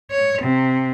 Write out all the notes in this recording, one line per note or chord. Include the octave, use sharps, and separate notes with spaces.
C#5
C3